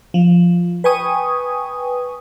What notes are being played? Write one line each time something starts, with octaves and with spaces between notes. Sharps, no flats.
F3
B4 G5 G#5 C#6 D#6